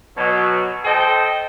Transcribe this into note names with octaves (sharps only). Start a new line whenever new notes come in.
B2 F#3
A4 C5 D#5 G5